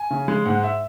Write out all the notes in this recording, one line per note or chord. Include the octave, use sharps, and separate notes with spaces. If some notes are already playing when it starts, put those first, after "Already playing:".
Already playing: G#5
C#3
G#3
G#2 F#5
E5